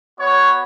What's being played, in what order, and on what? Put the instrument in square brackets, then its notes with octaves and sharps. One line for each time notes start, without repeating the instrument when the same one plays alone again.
[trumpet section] B3 F#4 C#5